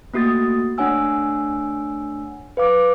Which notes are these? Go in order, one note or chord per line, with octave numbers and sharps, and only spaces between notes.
A3 A#3 F#4 D#6 A6
A3 D4 C#5 F#5 G#5 E6
B4 F5 D6